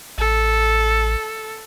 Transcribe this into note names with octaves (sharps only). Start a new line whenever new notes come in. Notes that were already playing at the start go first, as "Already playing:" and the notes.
A1 A4